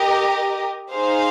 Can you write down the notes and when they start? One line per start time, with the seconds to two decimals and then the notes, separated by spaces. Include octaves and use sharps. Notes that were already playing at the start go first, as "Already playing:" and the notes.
Already playing: G4 A#4 D#5
0.92 D#4 G#4 C5 F5